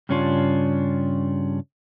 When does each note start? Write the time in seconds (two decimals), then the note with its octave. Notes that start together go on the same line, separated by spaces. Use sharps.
0.09 G2 C#3 C#4 D4 F4